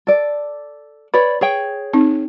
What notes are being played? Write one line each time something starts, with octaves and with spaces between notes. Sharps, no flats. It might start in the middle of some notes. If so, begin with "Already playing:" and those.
A4 D5
B4 C#5 D5 B5
G#4 C#5 G5
C4 D#4